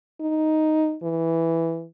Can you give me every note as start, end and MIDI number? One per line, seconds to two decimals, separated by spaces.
0.20 0.96 63
1.03 1.85 52